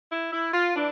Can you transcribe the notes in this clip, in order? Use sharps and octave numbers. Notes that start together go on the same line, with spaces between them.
E4
E4
F4
E3 D4